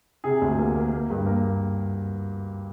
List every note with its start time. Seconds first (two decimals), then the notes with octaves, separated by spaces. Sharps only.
0.24 C3 G#4
0.41 D2
0.58 A#3
0.75 A#3
0.93 A#3
1.10 G2
1.26 A#3